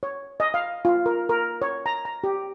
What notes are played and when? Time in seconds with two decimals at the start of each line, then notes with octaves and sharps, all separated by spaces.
0.03 C#5
0.40 D#5
0.54 F5
0.85 F4
1.06 A#4
1.29 A#4
1.62 C#5
1.86 A#5
2.05 A#5
2.24 G4